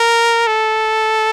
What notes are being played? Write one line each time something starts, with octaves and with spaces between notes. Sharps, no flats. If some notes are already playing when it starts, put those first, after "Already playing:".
Already playing: A#4
A4